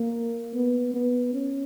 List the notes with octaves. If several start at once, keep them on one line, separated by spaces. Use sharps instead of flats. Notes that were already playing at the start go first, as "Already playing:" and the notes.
Already playing: A#3
B3
B3
C#4